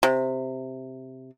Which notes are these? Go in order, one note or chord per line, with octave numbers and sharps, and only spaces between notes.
C3